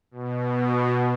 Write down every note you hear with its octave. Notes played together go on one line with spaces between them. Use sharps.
B2